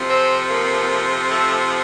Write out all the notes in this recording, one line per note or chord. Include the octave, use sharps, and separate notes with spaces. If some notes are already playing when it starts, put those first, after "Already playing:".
Already playing: F2 C3 F3
C4
A#3
A3